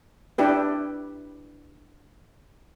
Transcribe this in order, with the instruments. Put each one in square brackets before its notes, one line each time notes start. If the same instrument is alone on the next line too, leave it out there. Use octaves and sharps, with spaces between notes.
[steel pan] D4 E4 G4 B4